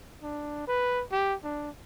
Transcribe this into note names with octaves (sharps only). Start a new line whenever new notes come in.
D4
B4
G4
D4